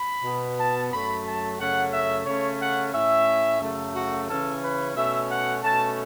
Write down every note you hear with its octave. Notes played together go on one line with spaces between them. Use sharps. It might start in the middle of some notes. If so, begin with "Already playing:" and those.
Already playing: B5
B2 B3
A5
F#2 F#3 A3 B5
A5
F#2 C#3 A3 C#4 F#5
E5
C#3 A3 C#4 C#5
F#5
A2 A3 C#4 E5
F#2 C#3 F#3 A3
F#4
C#3 E3 C#4 A4
B4
B2 A3 C#4 E5
F#5
B2 A3 C#4 A5